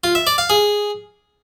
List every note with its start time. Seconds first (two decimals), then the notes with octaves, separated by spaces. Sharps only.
0.04 F4
0.15 E5
0.27 D5
0.38 F5
0.50 G#4